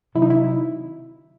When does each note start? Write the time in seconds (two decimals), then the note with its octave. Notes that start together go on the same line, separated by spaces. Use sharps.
0.15 C3 D#3 F#3 E4
0.22 D#4
0.30 E4